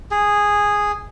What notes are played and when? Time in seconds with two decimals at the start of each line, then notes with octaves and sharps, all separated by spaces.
0.11 G#4